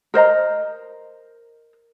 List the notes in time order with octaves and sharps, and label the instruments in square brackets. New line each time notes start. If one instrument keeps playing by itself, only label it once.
[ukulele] A#4 C5 D#5 A#5